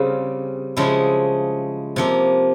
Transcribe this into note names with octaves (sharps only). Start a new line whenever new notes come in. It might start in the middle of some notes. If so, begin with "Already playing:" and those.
Already playing: C#3 G3 C4 F4 G#4
C#3 F3 G#3 E4
C3 F3 A#3